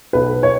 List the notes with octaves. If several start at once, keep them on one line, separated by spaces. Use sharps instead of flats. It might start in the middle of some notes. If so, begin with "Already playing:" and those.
B1 B4
C#5